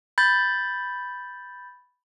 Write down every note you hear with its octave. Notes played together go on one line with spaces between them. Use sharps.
B5 G6 A6